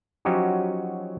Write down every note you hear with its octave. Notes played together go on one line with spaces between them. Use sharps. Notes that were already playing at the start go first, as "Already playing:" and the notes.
F3 F#3 C#4 D#4 F#4 G4